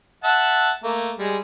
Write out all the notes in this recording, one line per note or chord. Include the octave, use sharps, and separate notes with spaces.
E5 F#5 A5
A3 A#3
G3 G#3